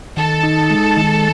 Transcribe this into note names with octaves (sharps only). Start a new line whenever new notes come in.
D#3 A4
D#4
G#3
D#3